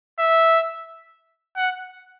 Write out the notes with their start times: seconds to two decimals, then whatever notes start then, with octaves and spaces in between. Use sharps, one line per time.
0.19 E5
1.57 F#5